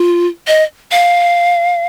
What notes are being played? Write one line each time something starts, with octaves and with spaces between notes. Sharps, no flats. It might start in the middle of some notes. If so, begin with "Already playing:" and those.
Already playing: F4
D#5
F5